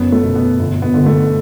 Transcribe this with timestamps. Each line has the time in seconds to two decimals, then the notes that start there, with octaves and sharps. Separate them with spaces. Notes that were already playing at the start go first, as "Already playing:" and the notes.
Already playing: F#1 F#3 B3
0.12 A3
0.24 B2
0.35 B3
0.59 G1
0.82 B3
0.94 D3
1.06 A3